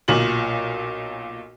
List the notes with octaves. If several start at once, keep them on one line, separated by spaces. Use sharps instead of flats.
B1 A#2 F#7